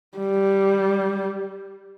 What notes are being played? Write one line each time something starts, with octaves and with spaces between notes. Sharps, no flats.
G3